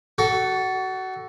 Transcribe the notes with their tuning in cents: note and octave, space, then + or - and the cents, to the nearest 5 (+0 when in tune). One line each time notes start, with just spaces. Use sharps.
F#4 +25 A4 +0